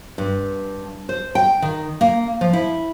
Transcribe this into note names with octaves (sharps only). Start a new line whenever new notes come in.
G2
C5
G5
D#3
A#3
F3
E4